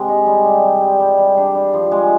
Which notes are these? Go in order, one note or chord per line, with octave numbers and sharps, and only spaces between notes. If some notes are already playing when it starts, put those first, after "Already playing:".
Already playing: C3 G#3
D#4
G3
G3
G3
G3
G3
G3
D4
G3
F3
G#3